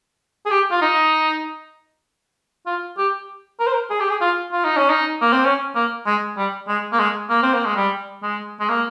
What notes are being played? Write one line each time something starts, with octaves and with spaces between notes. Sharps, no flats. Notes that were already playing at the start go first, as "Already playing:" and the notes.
G#4
G4
F4
D#4
F4
G4
A#4
C5
A#4
G#4
G4
G#4
F4
F4
D#4
C#4
D#4
A#3
C4
C#4
A#3
G#3
G3
G#3
A#3
G#3
A#3
C4
A#3
G#3
G3
G#3
G#3
A#3